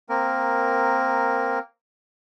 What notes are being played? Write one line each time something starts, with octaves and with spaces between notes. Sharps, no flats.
A#3 C4 A#4